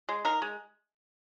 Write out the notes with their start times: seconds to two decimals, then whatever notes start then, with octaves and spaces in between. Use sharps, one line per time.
0.09 G#3
0.25 D#4 A#4
0.42 G#3